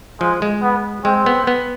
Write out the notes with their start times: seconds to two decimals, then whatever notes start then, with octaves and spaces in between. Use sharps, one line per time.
0.21 F3 G#3
0.42 G#3
0.63 B3
1.04 G#3 C4
1.26 B3
1.47 B3